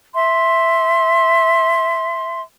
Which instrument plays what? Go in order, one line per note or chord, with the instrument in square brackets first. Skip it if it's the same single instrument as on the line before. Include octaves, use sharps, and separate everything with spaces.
[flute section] E5 C6